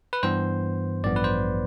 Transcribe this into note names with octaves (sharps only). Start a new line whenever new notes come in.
B4
G2 E3 B3 C5
A1 G2 F3 B3 D5
B4
C5